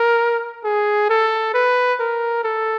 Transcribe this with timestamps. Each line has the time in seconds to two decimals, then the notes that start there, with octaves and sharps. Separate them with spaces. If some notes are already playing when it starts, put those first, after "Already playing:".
Already playing: A#4
0.64 G#4
1.10 A4
1.54 B4
2.00 A#4
2.44 A4